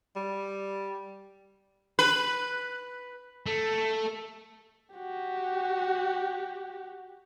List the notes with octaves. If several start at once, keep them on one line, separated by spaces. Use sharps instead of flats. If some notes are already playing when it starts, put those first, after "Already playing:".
G3
B4
A3
F#4 G4